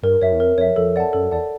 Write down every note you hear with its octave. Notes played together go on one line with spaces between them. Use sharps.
G2 A#4
F#2 C#5 E5
E2
F2 A#4
F2 C#5 E5
F2 A4
D5 F#5 A5
F#2 A4
E2 D5 F#5 A5